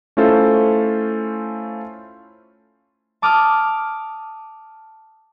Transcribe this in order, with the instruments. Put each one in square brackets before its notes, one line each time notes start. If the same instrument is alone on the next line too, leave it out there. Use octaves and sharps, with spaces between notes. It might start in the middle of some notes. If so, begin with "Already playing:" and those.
[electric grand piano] A3 C#4 E4 F4 A4 C5
[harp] A5 D6 D#6 F6